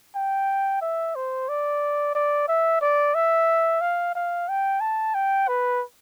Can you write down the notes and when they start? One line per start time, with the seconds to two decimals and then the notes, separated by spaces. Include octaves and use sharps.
0.15 G5
0.81 E5
1.16 C5
1.49 D5
2.15 D5
2.48 E5
2.81 D5
3.14 E5
3.81 F5
4.15 F5
4.48 G5
4.81 A5
5.14 G5
5.48 B4